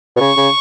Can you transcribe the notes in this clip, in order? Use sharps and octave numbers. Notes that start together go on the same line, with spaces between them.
B2
C#3 C#6
C#3